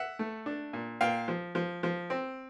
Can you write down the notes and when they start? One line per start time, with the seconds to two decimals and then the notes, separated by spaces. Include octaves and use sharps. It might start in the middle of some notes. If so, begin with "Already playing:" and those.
Already playing: E5 F#5
0.19 A3
0.46 D4
0.73 A#2
1.01 A#2 F5 G5
1.28 F3
1.55 F3
1.83 F3
2.10 C4